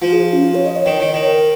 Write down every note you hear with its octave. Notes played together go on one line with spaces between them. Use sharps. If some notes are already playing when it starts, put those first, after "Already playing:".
F3 F4
G#4
F4
C#4
F4
C#5
D#5
C#5
D#3 D#5
D#3 C#5
D#5
D#3 C#5
A#4